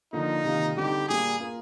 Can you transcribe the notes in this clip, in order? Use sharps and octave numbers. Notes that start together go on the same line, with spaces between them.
D3 F3 A#3 D#4 F4
C3 D#3 A#3 F4
D3 G3 C4 D#4 G4
A#2 G3 A#3 G#4
A#3 F4 A#4